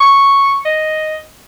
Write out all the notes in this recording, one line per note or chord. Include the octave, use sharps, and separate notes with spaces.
C#6
D#5